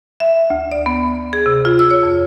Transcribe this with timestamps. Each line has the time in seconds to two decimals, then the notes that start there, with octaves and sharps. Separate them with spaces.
0.20 E5
0.50 D2
0.72 D5
0.86 B3
1.33 G#4
1.46 C3
1.65 F4
1.79 E6
1.91 C#5
2.03 F2